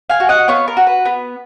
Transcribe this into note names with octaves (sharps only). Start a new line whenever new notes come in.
F5 G#5
F#4
D#5 F#5
B3 C#5 F5
A#4
F#4
B4
B3